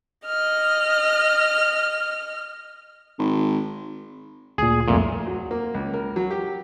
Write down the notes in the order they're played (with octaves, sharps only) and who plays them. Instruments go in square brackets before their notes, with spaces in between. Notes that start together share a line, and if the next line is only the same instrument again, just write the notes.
[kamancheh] D#5 F6
[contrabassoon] G#1
[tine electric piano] D2 A#2 [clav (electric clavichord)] G#4
[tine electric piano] C2 F2 A3 [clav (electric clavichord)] A#2
[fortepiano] F#3
A#3
C#2
A#4
F#3
G4